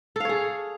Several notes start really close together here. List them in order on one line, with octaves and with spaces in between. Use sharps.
A4 F5 C#5 G#4